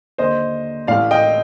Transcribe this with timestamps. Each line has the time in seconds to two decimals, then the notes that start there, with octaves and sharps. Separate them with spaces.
0.18 D#2 D3 C5 D#5
0.87 A1 A2 D5 F5
1.11 D#5 G5